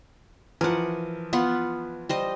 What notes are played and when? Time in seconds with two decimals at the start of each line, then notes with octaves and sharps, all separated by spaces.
0.61 E3 F3 A#4 F#5
1.33 B3 F4 F#5
2.09 G3 C5 D#5